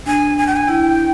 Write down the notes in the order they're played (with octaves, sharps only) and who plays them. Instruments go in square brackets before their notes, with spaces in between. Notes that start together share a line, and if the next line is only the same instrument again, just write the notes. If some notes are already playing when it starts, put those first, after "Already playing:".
[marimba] D4 [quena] G#5
[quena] G#5
G5
G#5
[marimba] E4 [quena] G5